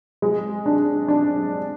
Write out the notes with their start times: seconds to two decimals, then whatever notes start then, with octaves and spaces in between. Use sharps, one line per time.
0.22 G#3
0.66 D4
1.08 D4